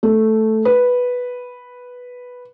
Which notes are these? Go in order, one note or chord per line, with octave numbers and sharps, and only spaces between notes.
A3
B4